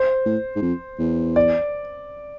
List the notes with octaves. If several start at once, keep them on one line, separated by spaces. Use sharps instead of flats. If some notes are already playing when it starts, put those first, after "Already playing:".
Already playing: C5
A2
G#2
F2
E2
D5